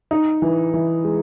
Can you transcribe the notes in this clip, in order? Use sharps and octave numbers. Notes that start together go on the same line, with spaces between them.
D#4
E3
E3
G#3